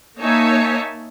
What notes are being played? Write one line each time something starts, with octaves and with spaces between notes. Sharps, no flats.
A#3 D#4 C#5 E5 G#5 A5